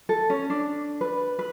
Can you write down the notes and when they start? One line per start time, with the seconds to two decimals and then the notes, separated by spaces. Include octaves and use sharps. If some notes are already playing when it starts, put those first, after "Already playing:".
0.09 A4
0.30 C#4
0.50 D4
1.01 B4
1.39 B4